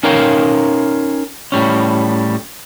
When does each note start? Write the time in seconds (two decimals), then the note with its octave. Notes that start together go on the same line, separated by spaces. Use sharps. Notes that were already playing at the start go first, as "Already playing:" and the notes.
0.03 C#4 D#4 A#4 C#5 F5 G5
1.52 A2 G3 C#4